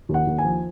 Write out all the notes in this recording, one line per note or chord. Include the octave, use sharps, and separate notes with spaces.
D#2
F#5
D#2
G#5
F3